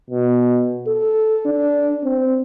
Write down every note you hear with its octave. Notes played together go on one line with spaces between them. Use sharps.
B2
A4
D4
C4